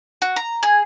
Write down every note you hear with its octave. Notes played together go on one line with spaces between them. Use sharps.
F#4
A#5
G#4